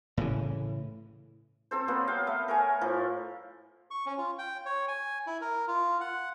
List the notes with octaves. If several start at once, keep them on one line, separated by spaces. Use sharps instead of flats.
A2 C#3 E3
C4 A4 C5
F#3 A#3 B3 F#5
F5 G5
A3
A#4 C#5 G#5
A2 F3
C#6
C#4
F4
G5
C#5
G#5
E4
A#4
F4
F#5